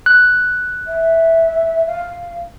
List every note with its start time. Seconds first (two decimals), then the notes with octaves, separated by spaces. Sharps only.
0.06 F#6
0.87 E5
1.87 F5